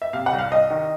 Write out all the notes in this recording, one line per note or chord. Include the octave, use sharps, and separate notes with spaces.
E5
C3 F5
F#5
C2
F5
C2 D#5
D#3